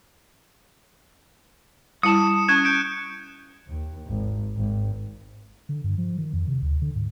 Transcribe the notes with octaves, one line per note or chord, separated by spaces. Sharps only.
G3 E4 A5 D#6 C#7 E7
C#4 C#6 F#6 G#6 E7
G6 D7 E7
D#2
G#1
G#1
D3
G2
F3
D#3
F2
C3
D2
D3
G#2